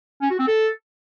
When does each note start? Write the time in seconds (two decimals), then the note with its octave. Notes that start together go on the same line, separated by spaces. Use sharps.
0.22 C#4
0.31 F#4
0.39 C4
0.48 A4